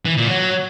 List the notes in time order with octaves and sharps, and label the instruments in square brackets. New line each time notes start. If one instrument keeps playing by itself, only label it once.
[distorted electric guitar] E3
A#2
F#3